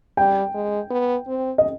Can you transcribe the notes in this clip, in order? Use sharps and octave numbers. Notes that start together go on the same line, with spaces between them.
G3 G5
G#3
B3
C4
D#5